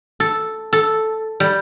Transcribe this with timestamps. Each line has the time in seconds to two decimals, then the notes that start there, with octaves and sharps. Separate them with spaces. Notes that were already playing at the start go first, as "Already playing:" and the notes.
0.20 A4
0.73 A4
1.40 G3